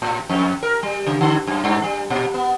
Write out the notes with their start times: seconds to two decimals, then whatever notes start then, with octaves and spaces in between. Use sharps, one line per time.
0.02 A2
0.29 F2
0.63 A#4
0.83 G3
1.06 C#3
1.21 D3
1.47 F#2
1.64 G2
1.84 G3
2.10 A#2
2.34 B3